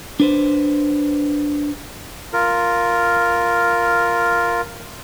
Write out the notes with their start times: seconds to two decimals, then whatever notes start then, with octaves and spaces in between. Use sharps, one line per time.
0.20 D4 B4 C5
2.33 F4 A#4